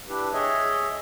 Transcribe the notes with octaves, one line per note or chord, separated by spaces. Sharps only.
D4 E4 G4 B4
G#4 C#5 D#5 E5